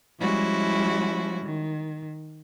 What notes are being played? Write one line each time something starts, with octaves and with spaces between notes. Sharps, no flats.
F3 G3 G#3 C#4 E4 F#4
D#3